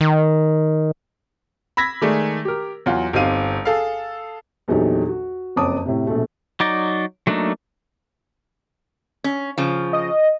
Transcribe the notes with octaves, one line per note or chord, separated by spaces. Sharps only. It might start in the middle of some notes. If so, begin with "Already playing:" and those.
D#3
B5 E6 G#6 A#6 B6
D#3 G#3 A3 G#4 D5
G4 A#4
E2 F#3 F4
G1 C4 D#4 G4 F5 D#7
G#4 A4 F5
A#1 E2 F#3 D#4 G4 A4
F#4
F#1 F2 C#5 A5 D6 D#6
A2 C3
A#1 B2 A3
F#3 D#4 D5
F#3 A3 A#3 D4 D#4
C#4
C#3 F3
D#5